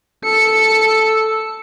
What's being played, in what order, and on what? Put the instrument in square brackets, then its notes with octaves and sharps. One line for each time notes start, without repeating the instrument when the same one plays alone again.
[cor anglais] A4 [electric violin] C#7